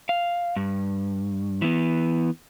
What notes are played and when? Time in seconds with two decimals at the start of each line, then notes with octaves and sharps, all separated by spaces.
0.09 F5
0.56 G2
1.62 E3 B3